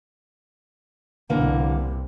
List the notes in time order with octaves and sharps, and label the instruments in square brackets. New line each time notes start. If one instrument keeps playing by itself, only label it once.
[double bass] C2 [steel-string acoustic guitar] D3 E3 A#3